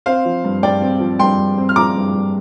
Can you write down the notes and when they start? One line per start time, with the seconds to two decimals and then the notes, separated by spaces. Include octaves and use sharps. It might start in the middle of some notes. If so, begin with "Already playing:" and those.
0.06 C4 C5 F5
0.25 F3
0.44 G2
0.63 G2 D5 G5
0.82 C4
1.00 F3
1.19 G2 G5 C6
1.39 G2
1.58 C4
1.69 F6
1.76 F3 A#5 D6
1.95 G2
2.15 G2